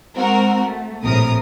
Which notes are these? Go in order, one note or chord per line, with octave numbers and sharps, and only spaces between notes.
G#3 C4 F#4 A#4
A3
A#1 A2 C3 A#4 D#6